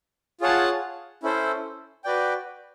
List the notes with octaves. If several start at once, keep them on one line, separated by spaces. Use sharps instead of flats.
F4 G#4 C#5 F#5 A5
C#4 E4 A4 C5
F#4 B4 D5 G5